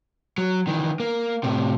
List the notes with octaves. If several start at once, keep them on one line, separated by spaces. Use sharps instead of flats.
F#3
D#3 E3
A#3
A2 C3